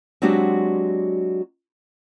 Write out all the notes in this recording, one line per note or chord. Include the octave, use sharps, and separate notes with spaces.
F#3 G#3 C4 D4 F#4 G4